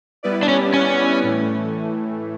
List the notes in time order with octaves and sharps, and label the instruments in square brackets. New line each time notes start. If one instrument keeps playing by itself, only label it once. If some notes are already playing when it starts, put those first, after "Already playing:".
[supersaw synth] G3 B3 E4 B4 D5
[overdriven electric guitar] D4
C#4
C#4
[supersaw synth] A2 E3 A3